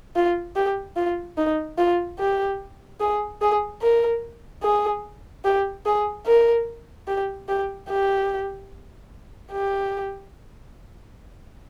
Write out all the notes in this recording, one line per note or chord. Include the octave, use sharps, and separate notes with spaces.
F4
G4
F4
D#4
F4
G4
G#4
G#4
A#4
G#4
G4
G#4
A#4
G4
G4
G4
G4